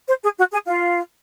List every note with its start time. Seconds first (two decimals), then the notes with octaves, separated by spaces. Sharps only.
0.07 C5
0.22 G#4
0.37 F#4
0.51 G#4
0.66 F4